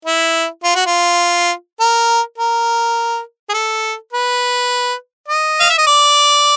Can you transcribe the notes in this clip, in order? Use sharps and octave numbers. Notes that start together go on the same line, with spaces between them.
E4
F4
F#4
F4
A#4
A#4
G#4
A4
B4
D#5
F5
E5
D#5
D5